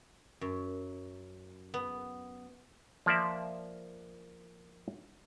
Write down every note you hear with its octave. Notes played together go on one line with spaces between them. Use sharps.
F#2
B3
F3 A#3 D5 E5